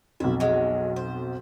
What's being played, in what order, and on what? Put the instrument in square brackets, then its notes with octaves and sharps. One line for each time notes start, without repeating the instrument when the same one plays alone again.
[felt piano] B1 F2 [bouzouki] E4
[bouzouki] F#3 G#3
C5